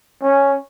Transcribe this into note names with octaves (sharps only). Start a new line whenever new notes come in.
C#4